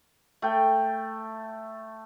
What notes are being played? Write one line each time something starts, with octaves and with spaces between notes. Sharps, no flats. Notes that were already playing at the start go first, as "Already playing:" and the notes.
A3 G5